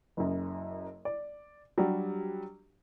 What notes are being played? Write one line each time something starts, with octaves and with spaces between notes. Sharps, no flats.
F#1 F#2
D5
F#3 G3 D4 F#4 G4